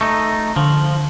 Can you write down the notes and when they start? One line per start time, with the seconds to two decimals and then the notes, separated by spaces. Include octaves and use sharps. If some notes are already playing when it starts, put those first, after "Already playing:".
0.01 A3 D#4
0.56 D3 F3